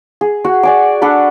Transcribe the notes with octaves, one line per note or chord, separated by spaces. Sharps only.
G#4
F#4 F#5
D5 G#5 D6
D4 A4 F#5 B5